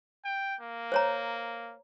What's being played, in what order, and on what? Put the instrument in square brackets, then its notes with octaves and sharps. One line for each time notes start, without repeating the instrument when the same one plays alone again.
[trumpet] G5
A#3
[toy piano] C5 C#5 A#5